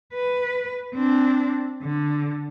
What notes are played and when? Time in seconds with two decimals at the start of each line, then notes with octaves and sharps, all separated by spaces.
0.14 B4
0.94 C4 D4
1.82 D3